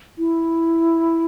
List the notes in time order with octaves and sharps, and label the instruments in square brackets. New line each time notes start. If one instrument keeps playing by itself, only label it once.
[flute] E4